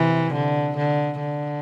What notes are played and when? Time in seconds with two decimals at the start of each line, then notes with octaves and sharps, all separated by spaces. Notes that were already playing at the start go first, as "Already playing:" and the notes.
Already playing: C3 E3
0.33 D3
0.77 D3
1.21 D3